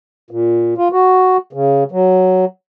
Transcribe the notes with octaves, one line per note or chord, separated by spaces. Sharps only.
A#2
F4
F#4
C#3
F#3